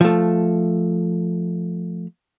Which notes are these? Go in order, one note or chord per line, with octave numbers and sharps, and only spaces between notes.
F3 A3